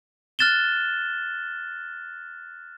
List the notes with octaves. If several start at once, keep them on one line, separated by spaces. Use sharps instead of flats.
F6 F#6 A6 E7 G7